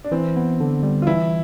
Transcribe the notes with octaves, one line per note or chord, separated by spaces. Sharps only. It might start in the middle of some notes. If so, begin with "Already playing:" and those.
D4
E3 C4
B3
D3
G3
F4
E3 E4